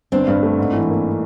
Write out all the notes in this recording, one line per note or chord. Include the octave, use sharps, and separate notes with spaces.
G1 C4 D4
G2
A3
G#2
E3
A#3